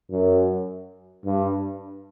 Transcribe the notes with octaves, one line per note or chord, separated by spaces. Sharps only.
F#2
G2